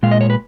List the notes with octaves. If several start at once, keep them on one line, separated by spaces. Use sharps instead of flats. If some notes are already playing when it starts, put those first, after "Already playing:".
A#2 G#3 F5
D#5
C#5
B4